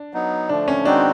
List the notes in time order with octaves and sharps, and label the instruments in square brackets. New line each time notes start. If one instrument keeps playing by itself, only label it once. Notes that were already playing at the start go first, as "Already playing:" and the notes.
Already playing: [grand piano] D4
[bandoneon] F#3 B3 D#4
[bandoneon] D3 F3 A3 [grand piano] D4
[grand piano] C#4
[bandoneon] D#3 G#3 C4 D#4 F#4 [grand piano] D4